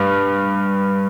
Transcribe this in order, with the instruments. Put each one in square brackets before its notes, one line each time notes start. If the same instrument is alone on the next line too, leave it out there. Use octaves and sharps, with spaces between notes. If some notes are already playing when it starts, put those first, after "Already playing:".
Already playing: [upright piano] G2